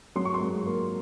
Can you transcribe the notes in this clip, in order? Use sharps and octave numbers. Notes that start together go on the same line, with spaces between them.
F#3 C6
C#6
C6
G#2
A#3